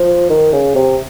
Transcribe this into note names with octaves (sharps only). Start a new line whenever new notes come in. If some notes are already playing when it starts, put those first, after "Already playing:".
Already playing: F3
D#3
C#3
C3